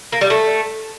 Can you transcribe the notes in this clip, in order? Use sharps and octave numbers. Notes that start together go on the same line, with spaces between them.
A#3
G3
A3